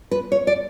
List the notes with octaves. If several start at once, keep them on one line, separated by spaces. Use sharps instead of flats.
B4
C#5
D5